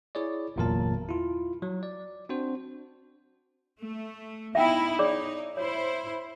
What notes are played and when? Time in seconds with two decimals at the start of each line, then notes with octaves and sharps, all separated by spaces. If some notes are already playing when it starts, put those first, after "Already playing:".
0.15 E4 G#4 C#5 D5
0.56 G1 E2 A#2 F#3 A#4 A5
1.09 E4 F4
1.62 F#3
1.83 D5
2.29 C4 D4 F#4 C5
3.81 A3
4.55 B3 D#4 E4 E5 F#5 G5
4.99 D#4 G#4 C#5 D5
5.57 E4 C5 C#5